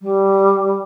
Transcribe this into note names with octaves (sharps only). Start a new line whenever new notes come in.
G3